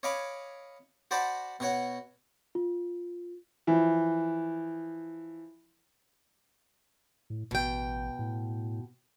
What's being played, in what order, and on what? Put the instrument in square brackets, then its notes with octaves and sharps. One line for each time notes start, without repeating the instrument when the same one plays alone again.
[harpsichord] C#5 D#5 F5 G#5 B5 D6
F#4 C5 D5 F#5 A5 B5
B2 F#4 C#5 F#5
[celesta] F4
[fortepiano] E3 F3
[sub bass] A2
[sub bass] A1 [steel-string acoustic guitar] B2 G5
[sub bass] A2